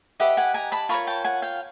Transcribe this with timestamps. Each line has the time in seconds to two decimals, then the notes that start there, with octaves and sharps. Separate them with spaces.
0.20 G4 B4 D#5 E5 F#5
0.37 F#5 G#5
0.54 G#5 A#5
0.72 A5 B5
0.89 F4 A#4 C#5 B5 C#6
1.07 G5 A5
1.24 F#5 G#5
1.42 F5 G5